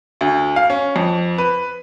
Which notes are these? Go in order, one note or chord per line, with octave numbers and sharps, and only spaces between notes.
D2
F5
C#4
F2
B4